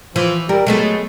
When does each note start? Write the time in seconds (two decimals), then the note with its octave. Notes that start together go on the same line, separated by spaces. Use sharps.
0.16 E3 F3
0.49 G3 A#4
0.67 F#3 G#3 A3 B3